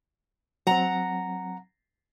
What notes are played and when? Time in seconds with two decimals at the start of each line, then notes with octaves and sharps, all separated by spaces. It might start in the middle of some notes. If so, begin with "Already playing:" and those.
0.67 F#3 C4 F#5 A#5